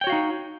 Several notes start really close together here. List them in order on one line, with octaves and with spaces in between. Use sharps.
G5 C#5 F#4 F5 D#4